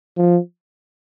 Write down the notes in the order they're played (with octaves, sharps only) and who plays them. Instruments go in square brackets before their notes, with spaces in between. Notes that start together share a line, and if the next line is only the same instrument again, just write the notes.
[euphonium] F3